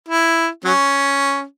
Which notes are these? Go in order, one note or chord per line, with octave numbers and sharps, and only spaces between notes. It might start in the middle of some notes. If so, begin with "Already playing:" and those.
E4
F#3 C#4